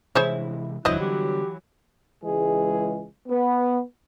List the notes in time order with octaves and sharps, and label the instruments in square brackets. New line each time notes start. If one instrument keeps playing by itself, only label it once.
[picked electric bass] C3 E3 G#3 [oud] E4 [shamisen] G#4 C5 C#5
[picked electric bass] F1 D#2 D3 [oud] E3 F#3 [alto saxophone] E4 [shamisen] C5 D#5
[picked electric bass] D3 G3 [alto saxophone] G4
[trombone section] C#2 E3 G#3 G#4
B3